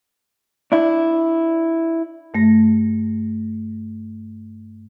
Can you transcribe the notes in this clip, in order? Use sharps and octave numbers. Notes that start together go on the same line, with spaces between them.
D4 E4
G2 A3 A#6